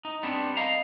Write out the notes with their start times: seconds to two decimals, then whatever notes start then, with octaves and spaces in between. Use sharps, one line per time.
0.05 D#4
0.23 G3 B3 C4 D4
0.57 D#5 F5 A#5